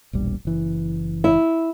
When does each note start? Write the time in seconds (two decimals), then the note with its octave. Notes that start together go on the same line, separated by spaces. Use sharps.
0.13 E1 A#1 G3
0.45 F#1 E3
1.24 E4